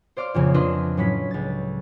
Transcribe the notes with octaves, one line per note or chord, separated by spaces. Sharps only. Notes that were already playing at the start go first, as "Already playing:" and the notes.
C5 D5 F5 D6 F6
A#1 F2 C#3
D4 F4 B4 D#5 B5 C6
A2 F#3 C#4 B5 B6
C#2 A6